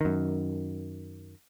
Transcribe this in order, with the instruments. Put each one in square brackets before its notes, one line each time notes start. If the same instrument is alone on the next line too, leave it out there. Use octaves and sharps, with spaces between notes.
[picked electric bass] F#2 D#3